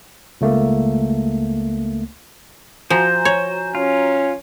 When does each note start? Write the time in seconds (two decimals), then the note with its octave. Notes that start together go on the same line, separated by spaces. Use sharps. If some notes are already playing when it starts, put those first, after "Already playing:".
0.41 C#2 A3 A#3
2.90 F3 F#4 C5 G#5 A#5
3.25 C#5
3.75 C#4 F4